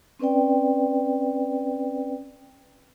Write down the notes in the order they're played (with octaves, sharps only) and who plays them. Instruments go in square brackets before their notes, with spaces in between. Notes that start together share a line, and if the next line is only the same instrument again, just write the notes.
[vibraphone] C4 C#4 B4 D5 G5